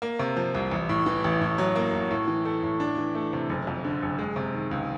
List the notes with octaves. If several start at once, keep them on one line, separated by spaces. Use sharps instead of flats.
A#3
C3
F3
C2
A1
A2
E3
A1
A2
F#3
A#3
A2
A2
E3
A3
A2
D4
E3
A3
C3
F#1
F2
D3
F#1
G#3
C3
D#3
C#2